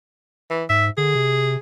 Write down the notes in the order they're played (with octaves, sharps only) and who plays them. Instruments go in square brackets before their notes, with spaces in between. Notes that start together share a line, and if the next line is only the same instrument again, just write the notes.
[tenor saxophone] E3
[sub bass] G#2 [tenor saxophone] E5
[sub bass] D3 [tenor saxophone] G#4
[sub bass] C3